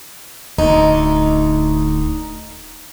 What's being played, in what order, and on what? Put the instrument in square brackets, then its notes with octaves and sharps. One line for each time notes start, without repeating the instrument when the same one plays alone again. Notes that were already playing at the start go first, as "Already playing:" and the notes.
[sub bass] D1 [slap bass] D2 [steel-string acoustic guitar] D#4